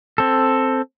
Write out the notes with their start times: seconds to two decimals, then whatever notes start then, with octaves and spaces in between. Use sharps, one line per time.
0.18 C4 A4